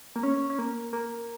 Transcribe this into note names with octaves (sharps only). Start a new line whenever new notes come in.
A#3
C#4
C#4
A#3
A#3